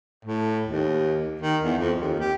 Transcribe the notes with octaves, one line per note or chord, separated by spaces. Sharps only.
A2
D#2
D#3
E2
F2
D#2
G4